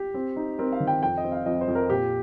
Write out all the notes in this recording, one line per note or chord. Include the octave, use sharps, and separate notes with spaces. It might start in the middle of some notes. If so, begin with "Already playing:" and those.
Already playing: G4
C4
D#4
C4 A#4
F5
D#3
G5
F2 G5
D#5
C4
F5
F2 D#5
C5
F2
A#4
A#2 G4